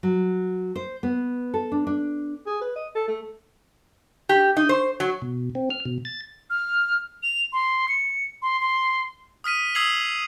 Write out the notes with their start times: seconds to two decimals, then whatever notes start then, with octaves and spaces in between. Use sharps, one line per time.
0.03 F#3
0.76 C5
1.03 B3
1.54 A4
1.72 D4
1.87 D4
2.46 G#4
2.61 B4
2.76 D#5
2.95 A4
3.08 A3
4.29 G4
4.57 D#4
4.69 C5
5.00 F#3
5.22 B2
5.55 C4
5.70 F6
5.85 B2
6.05 A6
6.50 F6
7.23 F7
7.53 C6
7.88 C#7
8.42 C6
8.60 C6
9.44 D#6 F6 B6 D#7
9.75 D#6 E6 G#6 C7 F7 F#7